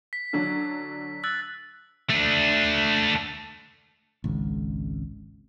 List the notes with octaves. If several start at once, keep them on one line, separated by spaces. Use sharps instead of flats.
B6
D3 F#3 D4
E6 F#6 A6
A3 D4
G#1 C#2